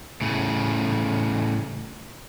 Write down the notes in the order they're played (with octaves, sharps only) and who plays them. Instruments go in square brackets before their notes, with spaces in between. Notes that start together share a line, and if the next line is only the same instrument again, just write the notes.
[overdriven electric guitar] A2 C#3